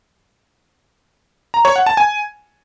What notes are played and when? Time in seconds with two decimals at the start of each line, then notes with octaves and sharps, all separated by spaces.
1.54 A#5
1.65 C#5
1.76 F#5
1.86 A5
1.97 G#5